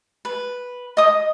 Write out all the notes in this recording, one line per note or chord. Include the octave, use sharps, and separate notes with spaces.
B4
D#5 D#6